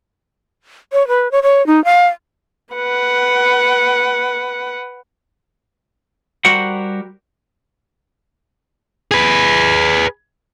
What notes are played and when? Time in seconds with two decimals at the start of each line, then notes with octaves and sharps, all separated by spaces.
0.93 C#5
1.08 B4
1.32 C#5
1.43 C#5
1.67 D#4
1.85 F5
2.74 B4 F#5
6.45 G3 F#4 G4 A#4 C5 F#5
9.11 G#4 B4